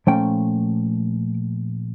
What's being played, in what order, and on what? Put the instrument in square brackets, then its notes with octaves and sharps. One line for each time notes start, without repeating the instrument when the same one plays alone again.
[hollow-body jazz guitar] A#2 F3 A3 C#4 G5